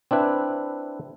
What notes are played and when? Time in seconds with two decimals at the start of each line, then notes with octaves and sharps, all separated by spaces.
0.11 C4 D4 E4 B4